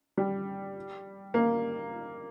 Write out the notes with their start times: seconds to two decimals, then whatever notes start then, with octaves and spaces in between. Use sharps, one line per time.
0.18 G3
1.34 A#3